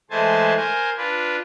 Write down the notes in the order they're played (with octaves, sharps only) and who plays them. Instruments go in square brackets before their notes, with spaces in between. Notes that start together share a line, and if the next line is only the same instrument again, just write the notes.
[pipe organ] E3 G#3 A3 C5 G#5 A5
A#4 C5 G#5
D4 F4 B4